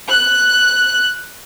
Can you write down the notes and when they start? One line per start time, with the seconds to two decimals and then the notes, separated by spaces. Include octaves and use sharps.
0.11 F#6